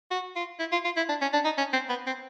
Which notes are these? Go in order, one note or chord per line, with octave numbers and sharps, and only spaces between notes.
F#4
F4
E4
F4
F4
E4
D4
C#4
D4
D#4
C#4
C4
B3
C4